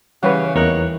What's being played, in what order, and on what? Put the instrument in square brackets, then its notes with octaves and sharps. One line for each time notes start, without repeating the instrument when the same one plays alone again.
[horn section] C#3 [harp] E3 G3 [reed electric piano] B4 C#5 F#5
[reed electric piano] E2 A#4 F#6 [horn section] A#3 D#4 C#5